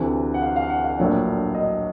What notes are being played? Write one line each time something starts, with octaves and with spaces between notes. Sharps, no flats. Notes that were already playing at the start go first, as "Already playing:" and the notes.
Already playing: D2 C3 E3
F#5
F5
F5
F#5
F5
A#1 A2 F#3 A#3 D4
D#5